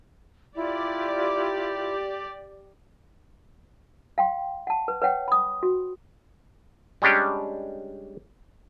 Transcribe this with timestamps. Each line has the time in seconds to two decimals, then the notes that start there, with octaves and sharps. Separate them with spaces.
0.57 E4 F4 G4 D5
4.18 F5 G5 C6
4.67 F#5 A5
4.88 B4
5.02 B4 C#5 F#5 G5
5.28 B5 D#6
5.63 F#4
7.02 G3 G#3 C#4 D4 G4